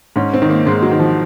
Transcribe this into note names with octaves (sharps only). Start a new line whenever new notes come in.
G#2 C#4
C4
D#3
A#3
G#2 G#3
F#3
D#3
F3